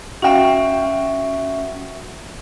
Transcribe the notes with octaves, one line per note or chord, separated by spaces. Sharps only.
C#4 F#4 E5 F5 G5